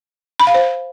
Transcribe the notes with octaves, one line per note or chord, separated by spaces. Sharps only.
B5
F5
C5